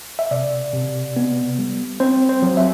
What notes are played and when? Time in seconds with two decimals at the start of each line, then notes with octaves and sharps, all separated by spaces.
0.19 E5
0.31 C3 D5
0.73 C3
1.16 B3
1.59 G3
2.00 C4 C5
2.29 C5
2.42 F#3
2.57 E5